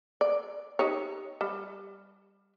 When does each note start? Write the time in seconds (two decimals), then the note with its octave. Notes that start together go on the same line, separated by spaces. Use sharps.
0.21 D5
0.79 D#4 G4 C#5
1.41 G3